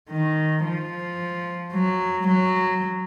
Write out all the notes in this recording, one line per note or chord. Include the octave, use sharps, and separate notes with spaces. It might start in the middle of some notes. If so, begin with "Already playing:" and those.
D#3
F3
F#3
F#3